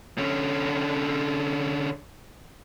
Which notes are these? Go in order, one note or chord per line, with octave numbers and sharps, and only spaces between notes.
D3 C#4